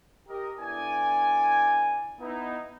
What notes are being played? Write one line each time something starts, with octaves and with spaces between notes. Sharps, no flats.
G4 A#4 D#5
D3 B3 E4 D5 G#5
B3 D#4 E4